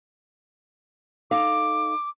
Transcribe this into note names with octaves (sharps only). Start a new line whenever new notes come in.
D#4 A4 F5 D6